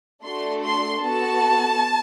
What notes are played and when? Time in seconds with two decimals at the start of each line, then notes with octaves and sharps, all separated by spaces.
0.24 A3 D4 F#4 A4 C6
0.63 C6
1.02 B3 F#4 A4 A5